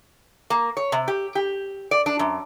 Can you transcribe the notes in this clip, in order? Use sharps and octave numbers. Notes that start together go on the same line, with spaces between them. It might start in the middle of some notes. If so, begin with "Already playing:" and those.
A#3
C#5
C3
G4
G4
D5
D4
F#2